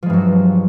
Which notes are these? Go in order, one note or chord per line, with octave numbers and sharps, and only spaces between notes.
G2 F3 F#3 G#3